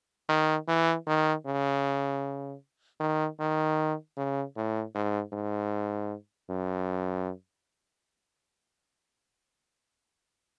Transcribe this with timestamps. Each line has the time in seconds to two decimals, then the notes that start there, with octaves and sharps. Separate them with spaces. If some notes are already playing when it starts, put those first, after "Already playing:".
0.29 D#3
0.68 E3
1.07 D#3
1.46 C#3
3.00 D#3
3.40 D#3
4.17 C#3
4.56 A2
4.95 G#2
5.33 G#2
6.50 F#2